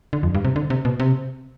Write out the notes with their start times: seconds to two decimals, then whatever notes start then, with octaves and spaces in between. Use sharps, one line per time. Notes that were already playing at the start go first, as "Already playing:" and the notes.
0.13 D3
0.23 F2
0.35 G2
0.45 C3
0.56 D3
0.70 C3
0.85 B2
1.00 C3